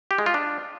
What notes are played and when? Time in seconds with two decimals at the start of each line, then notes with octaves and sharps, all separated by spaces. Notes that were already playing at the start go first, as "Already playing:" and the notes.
0.11 G4
0.18 G#3
0.26 F4
0.34 D4